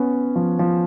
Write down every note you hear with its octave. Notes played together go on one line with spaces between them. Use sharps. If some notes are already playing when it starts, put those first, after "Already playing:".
Already playing: B3 C#4
F3
F3